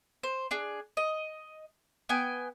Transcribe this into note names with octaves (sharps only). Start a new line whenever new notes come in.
C5
D4 G#4
D#5
B3 G5 G#5